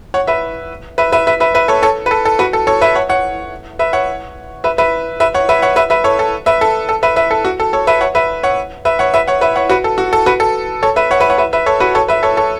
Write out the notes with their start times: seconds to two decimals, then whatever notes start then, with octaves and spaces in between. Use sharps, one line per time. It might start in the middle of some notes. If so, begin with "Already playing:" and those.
0.14 C#5 F#5
0.27 B4 E5
0.98 B4 E5
1.12 B4 E5
1.27 B4 E5
1.40 B4 E5
1.54 B4 E5
1.68 A4 C#5
1.82 A4 C#5
2.06 B4
2.11 A4
2.25 A4
2.39 F#4 B4
2.53 A4
2.67 A4 C#5
2.81 B4 E5
2.95 C#5 F#5
3.09 C#5 F#5
3.79 B4 E5
3.93 C#5 F#5
4.64 B4 E5
4.78 B4 E5
5.20 B4 E5
5.34 C#5 F#5
5.49 B4 E5
5.62 C#5 F#5
5.76 B4 E5
5.90 B4 E5
6.04 A4 C#5
6.19 A4
6.46 B4 E5
6.61 A4
6.89 A4
7.03 B4 E5
7.16 B4 E5
7.31 A4
7.45 F#4
7.60 A4
7.73 A4 C#5
7.87 B4 E5
8.01 C#5 F#5
8.15 B4 E5
8.43 C#5 F#5
8.85 B4 E5
8.99 C#5 F#5
9.14 B4 E5
9.28 C#5 F#5
9.41 B4 E5
9.56 C#5 F#5
9.70 F#4 B4
9.84 A4
9.98 F#4
10.13 A4
10.26 F#4 B4
10.40 A4
10.83 A4 C#5
10.96 B4 E5
11.11 C#5 F#5
11.20 B4 E5
11.30 C#5 F#5
11.38 B4 E5
11.53 B4 E5
11.66 A4 C#5
11.80 F#4 B4
11.95 A4 C#5
12.08 B4 E5
12.23 A4 C#5
12.37 A4 C#5